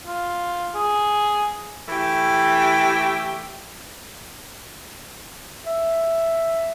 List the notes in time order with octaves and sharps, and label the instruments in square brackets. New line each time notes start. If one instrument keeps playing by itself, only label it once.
[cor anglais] F4
G#4
[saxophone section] E3 A3 G4
[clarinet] E5